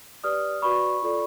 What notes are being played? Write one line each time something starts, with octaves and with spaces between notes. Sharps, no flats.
G4 B4 D5 D#6 F6
F#4 B4 D5 B5 C#6
F4 A4 D5